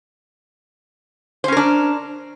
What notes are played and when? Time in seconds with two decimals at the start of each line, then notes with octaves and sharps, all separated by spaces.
1.44 C5
1.48 C#4
1.52 A#4
1.57 D4